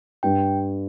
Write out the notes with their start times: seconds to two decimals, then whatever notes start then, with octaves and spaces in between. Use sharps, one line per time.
0.23 G2 G5